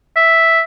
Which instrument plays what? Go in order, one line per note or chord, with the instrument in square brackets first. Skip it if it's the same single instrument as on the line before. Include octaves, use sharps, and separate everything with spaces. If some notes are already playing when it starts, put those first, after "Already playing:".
[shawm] E5